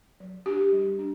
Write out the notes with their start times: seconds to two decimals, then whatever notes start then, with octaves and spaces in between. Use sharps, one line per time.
0.20 F#3
0.46 D4 G4
0.72 G3
0.99 D4